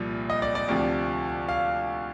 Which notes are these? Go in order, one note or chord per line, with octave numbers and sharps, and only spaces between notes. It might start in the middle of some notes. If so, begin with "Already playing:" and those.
Already playing: C2 A#2 F3
D#5
D5
D5
D2 C3 F3
F5